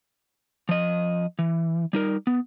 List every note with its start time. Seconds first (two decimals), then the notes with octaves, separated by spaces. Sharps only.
0.69 F3 D#5
1.39 E3
1.93 G3 D#4 A#4
2.27 B3